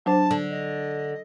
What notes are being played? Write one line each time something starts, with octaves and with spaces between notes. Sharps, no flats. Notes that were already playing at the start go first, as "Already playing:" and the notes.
F#3 D4 C5 A5
D3
D#5